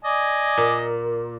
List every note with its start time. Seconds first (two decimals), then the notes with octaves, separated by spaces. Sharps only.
0.04 D5 D#5 G#5
0.57 A#2